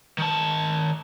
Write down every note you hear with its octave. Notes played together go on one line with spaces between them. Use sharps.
D#3 A5